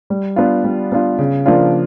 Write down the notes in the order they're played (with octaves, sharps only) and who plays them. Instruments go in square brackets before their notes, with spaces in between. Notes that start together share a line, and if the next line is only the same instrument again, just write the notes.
[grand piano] G3
B3 D4 F4
G3
B3 D4 F4
C#3
F3 A#3 D4 F4